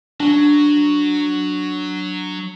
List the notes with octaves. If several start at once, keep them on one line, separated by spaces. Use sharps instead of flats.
F#3 D4